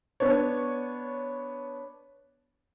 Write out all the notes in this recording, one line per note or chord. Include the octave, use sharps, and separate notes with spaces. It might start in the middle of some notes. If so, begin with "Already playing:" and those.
B3 D4 C#5